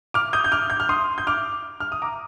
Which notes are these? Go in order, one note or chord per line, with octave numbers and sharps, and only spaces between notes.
D6 F6
D#6 G6
G6
D6 F6
G6
F6
C6 D#6
G6
D6 F6
F6
D#6
A#5 D6